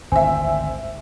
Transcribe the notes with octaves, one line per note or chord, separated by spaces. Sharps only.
G#1 D2 C4 E5 G#5